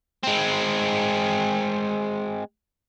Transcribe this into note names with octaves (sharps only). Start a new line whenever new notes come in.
G#3 C4